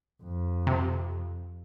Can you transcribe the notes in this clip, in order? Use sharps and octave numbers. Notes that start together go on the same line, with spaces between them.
F2
C3